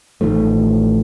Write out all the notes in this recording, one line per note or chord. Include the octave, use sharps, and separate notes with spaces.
A1 D#3 F3 A3